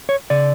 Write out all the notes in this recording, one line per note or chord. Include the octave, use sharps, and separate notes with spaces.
C#5
C#3 D5